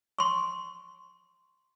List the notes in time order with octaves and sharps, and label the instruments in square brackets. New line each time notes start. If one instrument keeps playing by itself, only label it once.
[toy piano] C6 C#6